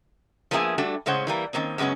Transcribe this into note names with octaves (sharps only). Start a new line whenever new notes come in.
F3 A#3 B3 C#4 G#4 E5
G3 A3 D4 F#4
A2 C#3 G#3 C#4 C5 F#5
E3 G3 A#3
D#3 A#3 C4 C#4
F#2 C#3 G#3 B3 C#4